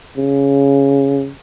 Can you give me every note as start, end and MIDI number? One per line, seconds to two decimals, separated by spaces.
0.17 1.30 49